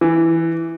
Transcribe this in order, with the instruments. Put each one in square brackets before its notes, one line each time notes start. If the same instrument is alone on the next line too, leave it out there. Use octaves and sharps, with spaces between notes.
[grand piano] E3